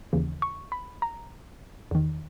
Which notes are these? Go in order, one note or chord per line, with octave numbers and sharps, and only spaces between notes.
D#2 C#3 E3
C#6
B5
A#5
E2 D#3